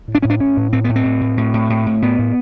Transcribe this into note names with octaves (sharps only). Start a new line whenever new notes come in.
A2
D4
A2 C#4
D4
A2 C#4
A2
A2 C4
A2 B3
C4
A2
A2
A2
A2
A2
A2
A2 B3
A2